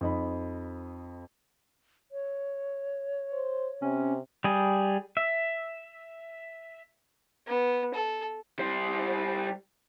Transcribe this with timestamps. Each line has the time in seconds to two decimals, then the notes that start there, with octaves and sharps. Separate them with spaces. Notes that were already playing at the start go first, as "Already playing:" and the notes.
0.01 F2 D#4 B5
2.12 C#5
3.33 C5
3.82 C3 C#4
4.44 G3 G#4
5.17 E5
7.47 B3
7.94 A4
8.59 G3 C5